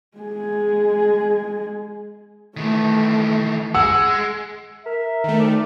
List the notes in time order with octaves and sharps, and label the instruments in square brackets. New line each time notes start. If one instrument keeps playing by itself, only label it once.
[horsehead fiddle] G#3 G#4
[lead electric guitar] D#3 E3 [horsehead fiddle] A3
[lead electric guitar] G#3 [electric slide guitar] F#5 [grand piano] E6
[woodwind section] A#4 E5
[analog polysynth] D#3 A3
[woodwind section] D2 D5